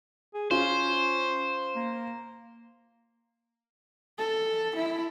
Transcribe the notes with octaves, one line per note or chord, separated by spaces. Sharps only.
G#4
C#4 F4 C5
A#3
A4
E4